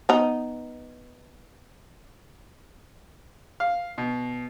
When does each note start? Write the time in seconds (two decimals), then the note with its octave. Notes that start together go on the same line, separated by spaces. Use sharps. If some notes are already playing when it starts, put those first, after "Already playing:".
0.09 B3 D#4
3.60 F5
3.98 B2